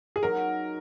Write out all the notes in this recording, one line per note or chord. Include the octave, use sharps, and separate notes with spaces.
G#4
F#3 D#4 F#4 A#4